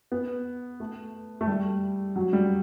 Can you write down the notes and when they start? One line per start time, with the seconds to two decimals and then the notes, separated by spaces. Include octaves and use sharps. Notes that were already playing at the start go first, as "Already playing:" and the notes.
0.12 B3
0.80 A3
1.41 A3
1.47 G3
2.16 F#3
2.33 G3